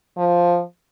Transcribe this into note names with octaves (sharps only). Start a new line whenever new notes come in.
F3